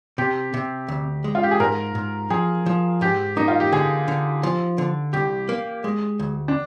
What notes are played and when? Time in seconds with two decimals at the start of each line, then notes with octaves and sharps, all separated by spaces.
0.18 C3 G4
0.54 C3
0.88 D2
1.24 G#3
1.35 F4
1.43 G4
1.51 G#4
1.60 G#2 A#4
1.95 G#2
2.30 F3 G#4
2.66 F3
3.01 G#2 G4
3.37 A#3 D#4
3.48 F4
3.60 G4
3.72 D3 G#4
4.08 D3
4.43 F3
4.78 D3
5.13 C2 G4
5.49 A#3
5.84 G#3
6.19 D2
6.48 D4